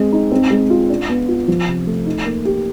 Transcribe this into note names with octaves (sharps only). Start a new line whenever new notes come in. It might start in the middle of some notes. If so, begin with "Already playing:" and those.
Already playing: G#3 C4
D#4
C4
G#3
F4
D4
B3
F4
F3
C3
A3
D#4
A#3
G4